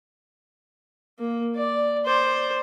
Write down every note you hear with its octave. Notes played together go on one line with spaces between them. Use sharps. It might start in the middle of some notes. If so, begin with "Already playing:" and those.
A#3
D5
C5 D5